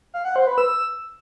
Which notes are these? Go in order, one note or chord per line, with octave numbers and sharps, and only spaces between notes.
F5
F#5
C5
B4
E6